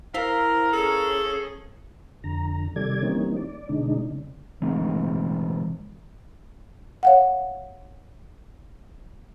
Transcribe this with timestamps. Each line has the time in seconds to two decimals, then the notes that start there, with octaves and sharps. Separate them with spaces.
0.14 E4 A#4 C5 F5
0.73 C#4 G#4 A4
2.24 F2 D3 A#5
2.76 C3 D#3 G3 A4 D5 G#6
3.02 E3 G3 A#3 C4 C#4 D#4
3.37 D5
3.69 B2 D3 G#3 D4 D#4
4.11 C#3
4.62 C#3 E3 G#3 C4
7.03 C#5 F5 F#5